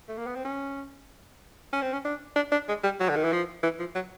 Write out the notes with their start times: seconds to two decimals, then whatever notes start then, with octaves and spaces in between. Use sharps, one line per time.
0.09 A3
0.17 A#3
0.27 B3
0.36 C4
0.45 C#4
1.73 C#4
1.82 C4
1.93 C#4
2.05 D4
2.36 D4
2.52 D4
2.69 G#3
2.84 G3
3.00 F#3
3.09 D3
3.16 D#3
3.24 E3
3.32 F3
3.63 E3
3.79 F3
3.95 F#3